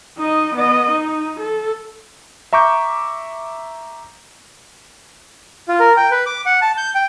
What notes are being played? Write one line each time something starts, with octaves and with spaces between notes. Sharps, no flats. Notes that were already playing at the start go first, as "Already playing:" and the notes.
D#4 D#5
B3 D#5
D#4
A4
E5 A#5 C#6 D6 G6
F4
A#4
G5
B4
D6
F#5
A5
G6
G5